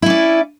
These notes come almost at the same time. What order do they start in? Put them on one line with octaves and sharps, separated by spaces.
E4 C#4 D5